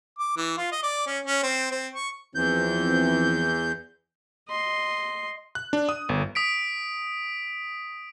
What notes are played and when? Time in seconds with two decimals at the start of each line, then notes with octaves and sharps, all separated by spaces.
0.19 D6
0.37 E3
0.57 F4
0.72 D#5
0.83 D5
1.07 C#4
1.26 C#4
1.43 C4
1.72 C4
1.95 C#6
2.35 E2 E3 F3 C4 G6
4.48 D#5 C6
5.55 F#6
5.73 D4
5.89 D#6
6.09 G1
6.35 D#6 B6 D7